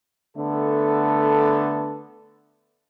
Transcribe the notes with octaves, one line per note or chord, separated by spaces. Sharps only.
D3 A3 B3 A4